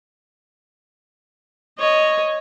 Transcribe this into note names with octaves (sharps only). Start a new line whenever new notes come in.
C#5 D#5